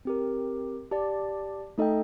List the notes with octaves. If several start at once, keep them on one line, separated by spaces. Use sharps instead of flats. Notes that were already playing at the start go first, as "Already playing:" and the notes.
C4 G4 A#4
G4 D5 A5
A3 D#4 A4 D#5 G5